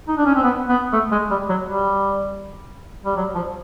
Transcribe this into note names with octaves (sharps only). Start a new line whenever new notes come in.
D#4
D4
C#4
C4
B3
B3
A3
G#3
G3
F#3
G3
G3
F#3
F3